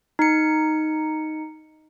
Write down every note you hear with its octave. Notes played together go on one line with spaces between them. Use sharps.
D#4 C#7